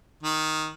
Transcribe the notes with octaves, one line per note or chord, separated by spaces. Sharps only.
D#3